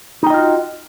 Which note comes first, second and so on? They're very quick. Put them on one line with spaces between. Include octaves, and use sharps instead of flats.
D#4 G5 D#5 F4 F#4